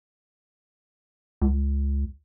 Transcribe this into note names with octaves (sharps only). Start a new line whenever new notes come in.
C#2